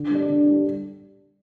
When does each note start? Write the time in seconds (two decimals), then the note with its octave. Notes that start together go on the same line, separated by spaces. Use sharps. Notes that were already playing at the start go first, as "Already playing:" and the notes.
Already playing: D3
0.10 G3 D4
0.29 D3
0.46 G3 D4